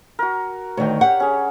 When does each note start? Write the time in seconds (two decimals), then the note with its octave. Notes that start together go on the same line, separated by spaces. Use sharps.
0.19 F#4 A#4
0.77 D2 D#3 C#5 G5
1.01 G4 F#5
1.20 C#4 G#4